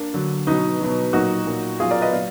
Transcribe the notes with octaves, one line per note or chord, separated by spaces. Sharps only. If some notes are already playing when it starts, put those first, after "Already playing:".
Already playing: A#3 D4
D3 F#3
B2 F#3 B3 D#4
B2 F#3
A#2 F#3 D#4 F#4
A#2 F#3
B2 F#3 F4 G#4
A#4 D5
B4 D#5
A#2 F#3 D5 F5